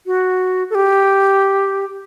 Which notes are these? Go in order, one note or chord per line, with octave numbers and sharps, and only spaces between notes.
F#4
A4
G4